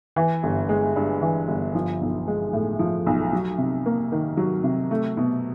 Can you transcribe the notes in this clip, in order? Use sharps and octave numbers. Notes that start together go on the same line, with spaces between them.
E3
G1
G#3
G2
E3
G1
F3
B1
G#3
A2
F3
B1
F#3
C3
A#3
D#3
F#3
C3
A3
B2